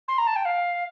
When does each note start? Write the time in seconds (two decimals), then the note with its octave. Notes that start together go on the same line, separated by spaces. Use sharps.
0.08 C6
0.18 A#5
0.27 A5
0.36 G5
0.45 F5